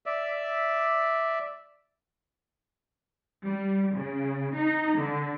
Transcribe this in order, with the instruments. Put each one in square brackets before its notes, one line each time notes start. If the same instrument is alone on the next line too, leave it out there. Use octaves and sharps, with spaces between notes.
[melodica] D5 E5
[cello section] G3
C#3
D#4
D3